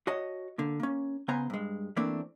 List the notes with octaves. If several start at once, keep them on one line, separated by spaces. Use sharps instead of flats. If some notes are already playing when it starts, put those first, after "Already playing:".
F#4 C#5 D#5 A5
D3 A#3
A#3 C#4
C#3 B3 C5 G#5 A#5
G2 G#3
E3 A3 A#3 C4 D4